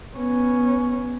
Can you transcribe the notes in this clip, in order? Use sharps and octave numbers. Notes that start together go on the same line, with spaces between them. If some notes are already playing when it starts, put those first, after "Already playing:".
B3 C#4